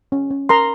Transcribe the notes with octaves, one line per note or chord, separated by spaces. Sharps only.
C#4
C#4
A#4 A#5 C6